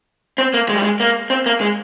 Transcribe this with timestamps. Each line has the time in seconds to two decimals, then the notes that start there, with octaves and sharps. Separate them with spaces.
0.38 C4
0.54 A#3
0.69 G#3
0.77 G3
0.83 G#3
1.00 A#3
1.30 C4
1.46 A#3
1.61 G#3